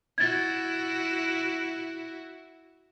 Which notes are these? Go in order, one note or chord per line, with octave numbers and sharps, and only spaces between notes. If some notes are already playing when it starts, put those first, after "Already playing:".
E4 F#4 G#6 A6